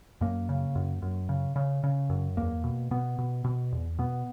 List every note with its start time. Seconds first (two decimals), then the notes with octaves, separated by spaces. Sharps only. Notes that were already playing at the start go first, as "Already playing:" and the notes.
0.21 F#2 A#3
0.49 C#3
0.75 F#2
1.02 F#2
1.29 C#3
1.56 C#3
1.83 C#3
2.10 F#2
2.37 E2 A#3
2.64 B2
2.91 B2 B3
3.18 B2
3.44 B2
3.72 E2
3.99 B2 B3